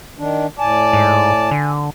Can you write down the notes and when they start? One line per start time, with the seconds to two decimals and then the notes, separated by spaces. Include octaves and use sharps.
0.19 D#3 D4
0.59 A2 D5 G#5 A5
0.93 G#2
1.51 D3